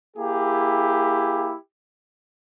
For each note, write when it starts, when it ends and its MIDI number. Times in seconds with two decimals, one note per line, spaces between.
0.17 1.54 58
0.17 1.54 64
0.17 1.54 67
0.17 1.54 68